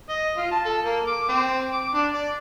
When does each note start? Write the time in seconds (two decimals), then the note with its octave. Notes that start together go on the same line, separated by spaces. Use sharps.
0.10 D#5
0.37 F4
0.52 A5
0.65 A4
0.84 A#3
1.07 D6
1.29 C4
1.73 D6
1.94 D4
2.14 D5